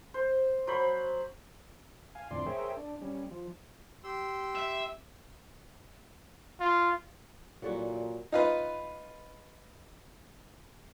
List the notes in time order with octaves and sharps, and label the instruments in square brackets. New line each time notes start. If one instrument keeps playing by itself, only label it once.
[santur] C5
F#3 C5 B5
[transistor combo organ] F5 G#5
F2 A2 D3 D5 C6
G#4 A#4 C5 C#5 E5 G5
D4
G3 C#4
F3
[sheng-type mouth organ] G4 C6 E6
[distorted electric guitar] E5
[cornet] F4
[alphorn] A#2 [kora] F#3 G3 F#4 [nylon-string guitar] E4 A4
[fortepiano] D#4 F4 B4